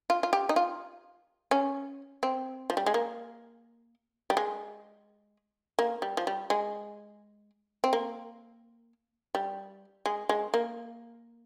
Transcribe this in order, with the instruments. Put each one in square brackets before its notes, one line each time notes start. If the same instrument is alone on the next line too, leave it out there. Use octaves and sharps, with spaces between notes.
[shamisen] F4
F4
G4
D#4
F4
C#4
C4
F3
G3
G#3
A#3
G3
G#3
A#3
G3
F3
G3
G#3
C4
A#3
G3
G#3
G#3
A#3